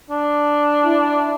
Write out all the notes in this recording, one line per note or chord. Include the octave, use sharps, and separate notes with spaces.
D4
E4